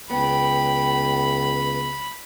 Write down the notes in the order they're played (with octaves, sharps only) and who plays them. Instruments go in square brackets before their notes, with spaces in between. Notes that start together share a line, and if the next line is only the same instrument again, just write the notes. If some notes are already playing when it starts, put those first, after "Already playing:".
[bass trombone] C#2 [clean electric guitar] B3 [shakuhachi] G5 [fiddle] B5